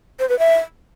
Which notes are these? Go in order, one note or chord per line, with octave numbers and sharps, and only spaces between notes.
C5
B4
E5